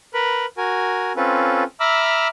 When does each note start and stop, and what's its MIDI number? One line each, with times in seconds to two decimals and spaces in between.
0.14 0.46 70
0.14 0.46 71
0.14 0.46 83
0.58 1.12 66
0.58 1.12 70
0.58 1.12 80
1.17 1.64 60
1.17 1.64 61
1.17 1.64 65
1.17 1.64 69
1.17 1.64 71
1.80 2.28 76
1.80 2.28 82
1.80 2.28 83
1.80 2.28 86
1.80 2.28 88
1.80 2.28 89